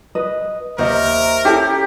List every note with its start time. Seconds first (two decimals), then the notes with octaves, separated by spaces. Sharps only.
0.15 B4 D#5
0.78 D#2 A#4 C5 D#5 E5
1.45 C#4 E4 G4 A4